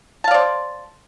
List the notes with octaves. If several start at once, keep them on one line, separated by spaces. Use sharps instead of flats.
C5 D5 F5 A5